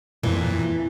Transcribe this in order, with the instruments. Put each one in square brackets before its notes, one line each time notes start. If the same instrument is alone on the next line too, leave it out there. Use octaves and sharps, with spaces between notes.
[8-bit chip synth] F2 A#2 [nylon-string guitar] E3